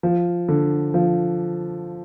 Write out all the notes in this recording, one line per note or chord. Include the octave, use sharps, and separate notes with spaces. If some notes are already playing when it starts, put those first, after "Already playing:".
F3
D3
F3